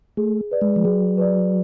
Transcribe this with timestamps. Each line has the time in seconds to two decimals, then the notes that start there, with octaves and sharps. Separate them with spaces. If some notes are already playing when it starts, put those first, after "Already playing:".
0.17 A3 G#4
0.51 B4 D5
0.61 G#3
0.76 F3
0.85 F#3 G#4
1.18 B4 D5